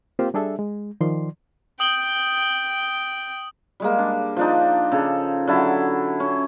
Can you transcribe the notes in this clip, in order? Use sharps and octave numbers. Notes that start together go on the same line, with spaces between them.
A#3 C4 F4 G4 A#4 C5
G3 D4 G#4 A4 E5
G#3
D#3 F3 D5 C6
G5 D#6 F#7 G7
G3 G#3 A#3
D4
F3 D4 D#4
C#3 A4
D3 F#3 E4 A5
C#4